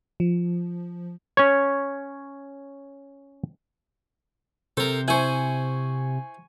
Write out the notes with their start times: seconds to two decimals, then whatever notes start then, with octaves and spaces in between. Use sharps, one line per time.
0.20 F3
1.37 C#4 C#5
4.77 C3 A4 A#4 C5
5.08 E4 C5 G#5 C#6